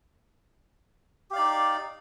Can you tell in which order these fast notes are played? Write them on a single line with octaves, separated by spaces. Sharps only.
G4 F5 D5 D#4